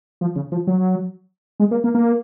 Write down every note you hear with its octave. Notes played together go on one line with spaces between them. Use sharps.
F3
C#3
F3
F#3
G#3
A#3
A#3
A#3